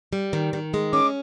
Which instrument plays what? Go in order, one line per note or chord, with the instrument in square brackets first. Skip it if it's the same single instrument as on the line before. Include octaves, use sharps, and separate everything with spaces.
[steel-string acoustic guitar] G3
D#3
D#3
G#3
[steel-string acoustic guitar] C#4 [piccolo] D6